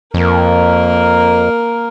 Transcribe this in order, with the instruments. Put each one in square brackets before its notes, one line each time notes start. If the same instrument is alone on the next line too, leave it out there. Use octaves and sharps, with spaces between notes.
[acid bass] F2 [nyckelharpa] A#3 A#4